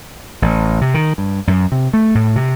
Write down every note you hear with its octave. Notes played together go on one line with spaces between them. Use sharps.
A1
C3
D#3
G2
F#2
C3
A3
A2
C3